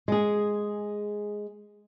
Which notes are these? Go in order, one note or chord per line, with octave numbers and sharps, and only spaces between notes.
G#3 G#4